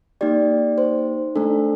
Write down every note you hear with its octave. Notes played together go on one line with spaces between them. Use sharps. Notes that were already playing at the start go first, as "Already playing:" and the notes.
A#3 D#4 G4 D5
C5
A3 D4 A4